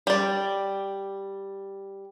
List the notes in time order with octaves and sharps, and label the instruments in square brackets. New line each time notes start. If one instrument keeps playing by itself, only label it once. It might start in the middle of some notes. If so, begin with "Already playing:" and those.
[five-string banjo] G3 D5